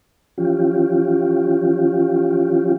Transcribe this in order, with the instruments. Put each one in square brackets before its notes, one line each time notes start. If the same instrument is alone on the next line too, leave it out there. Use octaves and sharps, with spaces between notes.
[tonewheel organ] E3 F3 C#4 F4 G4